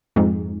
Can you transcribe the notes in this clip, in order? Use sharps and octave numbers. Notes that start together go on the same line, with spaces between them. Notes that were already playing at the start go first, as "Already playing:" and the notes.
F2 G#2